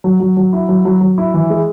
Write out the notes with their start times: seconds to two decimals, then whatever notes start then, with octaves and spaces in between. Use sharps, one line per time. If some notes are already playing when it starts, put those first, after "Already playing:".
0.04 F#3
0.20 F#3
0.37 F#3
0.53 E4
0.69 F#3
0.85 F#3
1.01 F#3
1.18 E4
1.34 E3
1.50 G#3